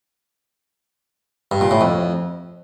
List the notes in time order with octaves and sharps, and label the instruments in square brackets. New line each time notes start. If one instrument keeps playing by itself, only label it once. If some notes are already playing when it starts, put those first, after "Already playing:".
[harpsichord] G2
A#2
A2
F2